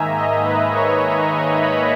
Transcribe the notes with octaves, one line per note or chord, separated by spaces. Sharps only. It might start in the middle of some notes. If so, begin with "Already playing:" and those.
Already playing: G#2 D#3 A#3 D#4 E5 G#5 A#5
D#5
B4
C#5
E5
G#5
B5